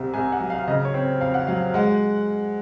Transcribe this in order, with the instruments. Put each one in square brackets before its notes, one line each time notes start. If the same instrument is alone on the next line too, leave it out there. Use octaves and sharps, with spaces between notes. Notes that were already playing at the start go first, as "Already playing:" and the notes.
Already playing: [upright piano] C2 C3
C2 G#5
F#5
F#3
F5
C#3 D#5
C#5
C4
F2 F5
F#5
F#3 F5
G#3 F#5